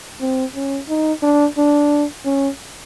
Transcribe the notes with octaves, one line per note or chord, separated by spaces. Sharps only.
C4
C#4
D#4
D4
D4
C#4